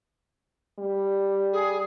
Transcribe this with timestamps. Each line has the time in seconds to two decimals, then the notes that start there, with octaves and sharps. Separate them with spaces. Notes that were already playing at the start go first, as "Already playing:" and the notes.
0.79 G3
1.53 G#4